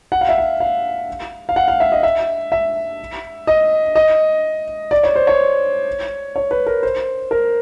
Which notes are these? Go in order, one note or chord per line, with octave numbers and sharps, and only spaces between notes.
F#5
F5
E5
F5
F5
F5
F#5
F5
E5
D#5
E5
E5
D#5
D#5
D5
C#5
C5
C#5
C#5
B4
A#4
C5
A#4